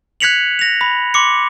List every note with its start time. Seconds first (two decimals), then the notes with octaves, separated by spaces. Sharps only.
0.20 F#6 G#6 B6 C#7 F7 F#7
0.59 A#6 F7
0.81 B5
1.14 C6 D6 C#7